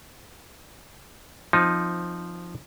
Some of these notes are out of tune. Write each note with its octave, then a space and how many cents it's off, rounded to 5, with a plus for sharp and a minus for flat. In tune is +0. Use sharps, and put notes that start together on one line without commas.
F3 +0 C4 -5 D#4 +0